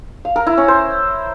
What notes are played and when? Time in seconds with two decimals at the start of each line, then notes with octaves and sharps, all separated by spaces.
0.25 F5
0.36 A#4
0.47 E4
0.57 C#4
0.68 C5